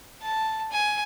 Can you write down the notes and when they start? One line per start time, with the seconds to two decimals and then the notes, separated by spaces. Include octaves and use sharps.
0.22 A5
0.72 G#5